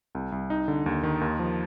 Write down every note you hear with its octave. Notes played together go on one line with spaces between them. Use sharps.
C2
C2
D#4
D3
D#2
D#3
D#2
F3